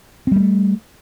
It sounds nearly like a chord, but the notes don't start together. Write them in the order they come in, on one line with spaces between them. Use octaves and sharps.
C4 G3 A#3 A3